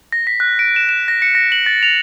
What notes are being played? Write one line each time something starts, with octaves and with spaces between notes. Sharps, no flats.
A#6
B6
F#6
D7
E7
E7
A#6
C#7
A#6
F#7
A6
F7